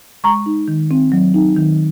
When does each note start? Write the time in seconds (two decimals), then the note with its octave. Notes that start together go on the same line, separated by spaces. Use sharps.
0.24 G#3 A#5 C#6
0.46 D#4
0.68 D#3
0.91 C4
1.12 F#3
1.34 D#4
1.56 D#3